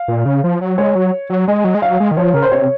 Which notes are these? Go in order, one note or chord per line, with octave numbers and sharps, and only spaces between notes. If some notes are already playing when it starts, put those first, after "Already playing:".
Already playing: F5
A#2
C#3
F3
F#3
G#3 C#5
F#3
F#3
G#3 D#5
F#3
G#3
F#3 F5
G#3
D#3
F3 C#5
C#3 A#4
C5
C3 C#5